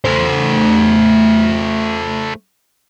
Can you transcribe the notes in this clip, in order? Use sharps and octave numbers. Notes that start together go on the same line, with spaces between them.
A3 C5